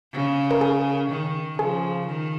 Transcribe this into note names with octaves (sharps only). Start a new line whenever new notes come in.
C#3
A#4
G#4
D#3
C#3 F3 G#4
D#3